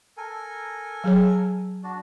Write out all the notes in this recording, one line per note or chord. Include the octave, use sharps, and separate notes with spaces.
A4 A#4 G#5
F#3 G#4 C#5
D4 F#4 D5